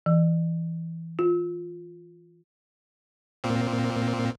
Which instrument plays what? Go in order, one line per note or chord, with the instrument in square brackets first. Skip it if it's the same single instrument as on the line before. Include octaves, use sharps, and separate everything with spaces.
[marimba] E3
F4
[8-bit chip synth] A#2 A#3 C4